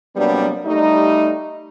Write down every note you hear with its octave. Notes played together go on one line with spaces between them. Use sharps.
C3 F#3 G3 A#3 B3 D4
G3 A3 D#4